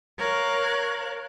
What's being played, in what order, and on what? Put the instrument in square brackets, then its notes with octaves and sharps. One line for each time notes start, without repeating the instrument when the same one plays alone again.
[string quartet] A#4 C#5 F5 F#6